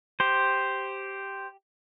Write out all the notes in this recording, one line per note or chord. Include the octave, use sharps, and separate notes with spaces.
G4 C5